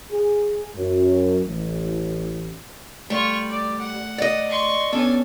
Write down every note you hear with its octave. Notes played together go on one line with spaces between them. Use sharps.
G#4
F#2
A1
G3 A3 F4 C#6
D5
F#5
D5 D#5
C6 C#6
B3 C#4 D4 A4 C#5 G#5